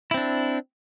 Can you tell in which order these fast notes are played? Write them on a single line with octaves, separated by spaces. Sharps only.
E4 C4 D4